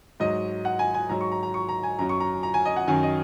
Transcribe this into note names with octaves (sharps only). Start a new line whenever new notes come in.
G#2 F#3 D#5
F#5
G#5
G#5
G#2 F#3 A#5
C#6
A#5
A#5
C#6
A#5
G#5
F#2 F#3 A#5
C#6
A#5
A#5
G#5
D#5
F#5
F#2 D#3 F#3 G#5
D#5